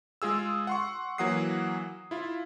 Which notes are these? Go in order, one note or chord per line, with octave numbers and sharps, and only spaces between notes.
G#3 F4 G#4 E6
F#5 C6 C#6
E3 F#3 A#3 F#5 D#6 C7
E4 F4